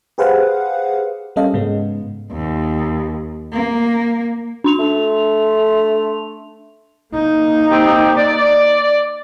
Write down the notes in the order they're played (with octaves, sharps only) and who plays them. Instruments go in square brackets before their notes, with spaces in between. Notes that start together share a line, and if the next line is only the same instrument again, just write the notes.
[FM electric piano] G4 G#4 B4 C5 F5 F#5
G3 A#3 C#4 A4 D#5 F5
G#2 C#3 G#3 B3
[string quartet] D#2
A#3
[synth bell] D4 C6 F7
[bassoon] A3
[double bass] A#3 D#4
[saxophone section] C4 G4
D5